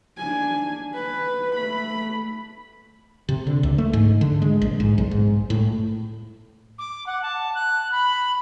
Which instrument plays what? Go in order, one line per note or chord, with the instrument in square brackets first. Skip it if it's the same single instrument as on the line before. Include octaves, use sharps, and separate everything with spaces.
[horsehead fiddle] D4 G#5
B4
A3 B5
[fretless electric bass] C3
D3
C#2
A3
G#2
D3
G#3
A#1
G#2
B1
G#2
A2
[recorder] D6
F#5
A5
F#6
B5